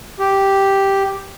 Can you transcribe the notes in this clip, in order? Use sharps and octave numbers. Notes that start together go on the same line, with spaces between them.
G4